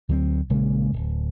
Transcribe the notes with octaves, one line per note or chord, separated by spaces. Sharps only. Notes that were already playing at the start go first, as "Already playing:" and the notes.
D2 F#3 G3 C4
A#1 C#3 G#3 A#3
D1